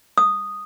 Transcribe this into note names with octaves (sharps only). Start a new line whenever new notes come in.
D#6